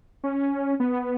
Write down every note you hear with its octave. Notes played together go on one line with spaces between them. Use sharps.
C#4
B3